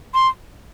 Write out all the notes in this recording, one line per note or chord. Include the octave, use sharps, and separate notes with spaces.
C6